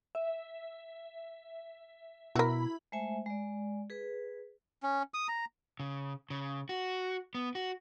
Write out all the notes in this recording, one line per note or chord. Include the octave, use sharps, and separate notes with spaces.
E5
B2 E4 F#4 A#4 B5
G#3 A3 C5 E5 G#5
G#3 D5
G#4 B4
C#4
D#6
A#5
C#3
C#3
F#4
B3
F#4